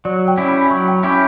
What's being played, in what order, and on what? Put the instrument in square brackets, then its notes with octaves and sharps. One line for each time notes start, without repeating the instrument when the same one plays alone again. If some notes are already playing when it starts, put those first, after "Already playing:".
[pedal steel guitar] F#3 [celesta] D5
[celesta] G5
[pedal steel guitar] C#4 E4 G4
[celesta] B5
[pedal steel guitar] F#3 [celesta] C#6
[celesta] G5
[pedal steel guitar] C#4 E4 G4 [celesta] G5